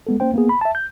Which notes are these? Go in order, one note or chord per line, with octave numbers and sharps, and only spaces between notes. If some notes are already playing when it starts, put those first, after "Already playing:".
G#3 B3 A4
A#3 C#4 C5 G5
A#3 B3 G#4
B5
E5 A5
G6